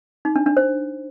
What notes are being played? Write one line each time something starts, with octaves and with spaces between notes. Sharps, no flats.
D#4
D4
D4
C5